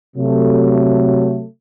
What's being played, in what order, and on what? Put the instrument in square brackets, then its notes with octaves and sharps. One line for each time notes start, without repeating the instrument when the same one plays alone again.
[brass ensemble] C3 F#3 A3